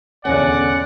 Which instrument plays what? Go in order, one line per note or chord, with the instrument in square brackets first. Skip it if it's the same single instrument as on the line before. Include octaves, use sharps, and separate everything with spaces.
[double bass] E2 D3 [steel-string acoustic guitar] C#4 [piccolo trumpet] D5 [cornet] F#5